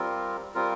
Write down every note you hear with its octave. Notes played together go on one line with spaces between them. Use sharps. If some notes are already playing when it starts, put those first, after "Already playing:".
Already playing: G3 C4 F4 A#4
G3 C4 F4 A#4